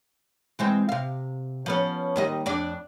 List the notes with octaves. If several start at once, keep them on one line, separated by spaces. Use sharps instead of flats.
E3 G#3 C4
C3 F5
F3 B3 C#4
D#2 G3 D#5
F2 D4 D5